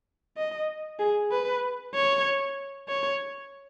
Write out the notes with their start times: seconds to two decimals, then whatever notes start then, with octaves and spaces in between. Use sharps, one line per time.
0.37 D#5
0.99 G#4
1.31 B4
1.94 C#5
2.89 C#5